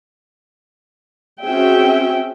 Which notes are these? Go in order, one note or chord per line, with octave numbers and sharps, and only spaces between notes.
C4 C#4 F#4 G#4 E5 G5